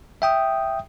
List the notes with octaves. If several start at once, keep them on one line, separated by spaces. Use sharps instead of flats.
E5 G5 D#6